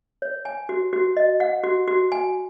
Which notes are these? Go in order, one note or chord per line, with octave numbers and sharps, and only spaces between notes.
C#5
G#5
F#4
F#4
D#5
F#5
F#4
F#4
G#5